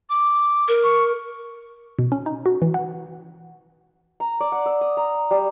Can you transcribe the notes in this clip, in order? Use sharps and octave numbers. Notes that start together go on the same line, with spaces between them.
D6
A#4
C#6
B2
C#4
D#4
F#4
E3
F#5
A#5
D5
F#5
E6
D#6
A#5
G3